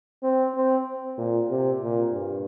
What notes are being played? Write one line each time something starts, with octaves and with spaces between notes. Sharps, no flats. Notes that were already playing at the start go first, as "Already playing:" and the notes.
C4
C4
A#2
C3
A#2
G2